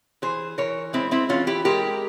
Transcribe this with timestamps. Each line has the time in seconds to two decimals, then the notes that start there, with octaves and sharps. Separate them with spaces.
0.22 E3 G#4 C5
0.58 E3 A#4 C#5
0.93 G#3 C4 E4
1.11 C4 E4
1.29 E3 C#4 F4
1.47 E4 G4
1.65 G#3 G4 A#4